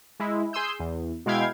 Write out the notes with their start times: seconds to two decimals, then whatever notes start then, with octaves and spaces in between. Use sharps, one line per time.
0.20 G#3 E4
0.53 G#4 C6 D#6 E6 G6
0.80 E2
1.26 B2 G#3 E4 F5 G5 G#6